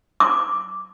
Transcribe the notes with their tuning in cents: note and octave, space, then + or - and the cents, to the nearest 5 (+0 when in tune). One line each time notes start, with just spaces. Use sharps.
D6 -5